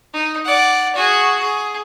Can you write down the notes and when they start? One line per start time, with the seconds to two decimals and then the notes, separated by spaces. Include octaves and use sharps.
0.13 D#4
0.45 D5 F#5
0.95 F#4 G#4
1.39 G#4